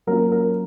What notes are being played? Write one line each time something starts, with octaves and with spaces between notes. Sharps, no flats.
F#3 A#3 C#4 F4 A#4
A#4